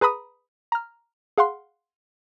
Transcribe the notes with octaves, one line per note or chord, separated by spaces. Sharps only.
G#4 B4 A#5 B5 D#6
A#5 F6
G#4 F5 F#5 C6